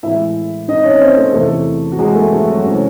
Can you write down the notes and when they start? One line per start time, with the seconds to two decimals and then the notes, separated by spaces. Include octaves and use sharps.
0.03 A2 E3 G#3 E4 E5
0.68 D#4 D#5
0.84 C#4 C#5
1.01 C4 C5
1.17 A3 A4
1.34 E2 C3 E3 A3 A4
1.92 F#4
1.99 G#3 G#4
2.15 A3 A4
2.33 A3 A4
2.48 F#3 F#4
2.65 C3 E3 G#3 C#4